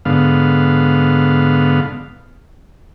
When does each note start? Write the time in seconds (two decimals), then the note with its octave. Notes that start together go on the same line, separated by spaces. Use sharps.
0.05 G#2 D3 B3 F5